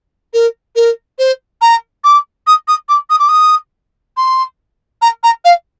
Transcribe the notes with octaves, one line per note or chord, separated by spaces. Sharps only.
A#4
A#4
C5
A#5
D6
D#6
D#6
D6
D#6
D6
D#6
C6
A#5
A#5
F5